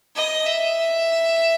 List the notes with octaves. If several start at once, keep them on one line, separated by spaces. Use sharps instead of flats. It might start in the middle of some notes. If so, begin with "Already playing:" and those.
D#5
E5